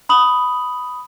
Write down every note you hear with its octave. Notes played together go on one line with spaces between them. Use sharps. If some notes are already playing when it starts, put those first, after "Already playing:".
B5 D#6 F#7